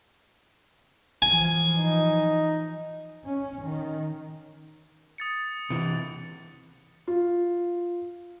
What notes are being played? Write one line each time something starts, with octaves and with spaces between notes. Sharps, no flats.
E3 F3 G#5
D#4
C#4
D#3
D#6 A6 C#7
C3 E3
F4